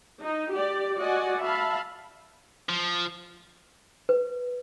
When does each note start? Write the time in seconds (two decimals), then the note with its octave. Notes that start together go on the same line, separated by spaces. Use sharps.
0.22 D#4
0.52 G4 D5
0.99 F#4 D5 D#5 F#5 G#5
1.41 E5 F5 A5 B5
2.69 F3
4.09 B4